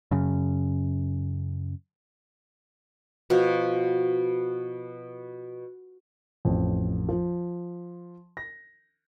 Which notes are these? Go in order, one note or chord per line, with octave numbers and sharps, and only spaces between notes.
F#2 C#3
B2 F3
A1 F2
F3
A#6